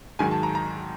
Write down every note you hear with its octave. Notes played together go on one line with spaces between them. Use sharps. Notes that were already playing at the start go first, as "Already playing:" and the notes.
G#2 D#3 F#3 G#5
A5
A#5
A#5